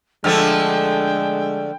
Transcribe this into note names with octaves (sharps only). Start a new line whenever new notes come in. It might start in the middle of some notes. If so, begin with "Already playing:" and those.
D3 F3 G#3 A3 A4 G5 F6